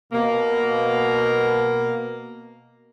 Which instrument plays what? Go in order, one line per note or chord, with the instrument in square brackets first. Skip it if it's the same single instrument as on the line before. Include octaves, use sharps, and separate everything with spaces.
[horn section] B2 A#3